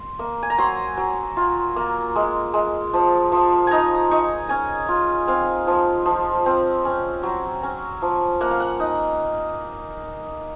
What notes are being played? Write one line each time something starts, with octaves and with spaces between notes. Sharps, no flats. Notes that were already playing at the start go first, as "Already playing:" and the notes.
Already playing: C6
A#3
G#5
A#5
F#3 C6
F#3
F4
A#3
G#3
G#3
F3
F3
D#4 G#5 A#5
D#4 C#6
C#4 G#5
F4
C4 F5
F3
F3
C4
C#4
F#3
C#4
F3
A#3 F#5
F5
F#5
D#4